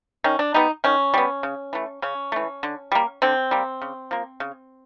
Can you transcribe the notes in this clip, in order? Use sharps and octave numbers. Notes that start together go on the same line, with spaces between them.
D#3 C#4
D4
G3 B3 D#4
D#3 C#4
G3 B3
C#3
E3 A3
C#3 C#4
E3 A3
D3
G3 A#3
D3 C4
G3 A#3
C#3
F3 A#3
C#3